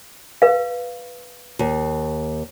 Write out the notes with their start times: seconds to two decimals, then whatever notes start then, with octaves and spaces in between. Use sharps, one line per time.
0.42 B4 F5
1.59 D#2